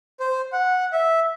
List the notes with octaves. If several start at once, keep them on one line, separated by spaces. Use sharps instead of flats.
C5
F#5
E5